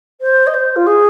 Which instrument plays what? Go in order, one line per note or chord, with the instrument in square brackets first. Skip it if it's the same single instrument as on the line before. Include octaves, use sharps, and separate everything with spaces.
[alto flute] C5
D#5
C5
F4
G#4